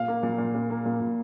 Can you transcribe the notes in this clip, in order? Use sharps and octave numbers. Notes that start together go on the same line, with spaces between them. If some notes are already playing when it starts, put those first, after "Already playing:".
Already playing: A#2 F5
A#3
A#2
A#2
A#2
A#3
A#2
A#2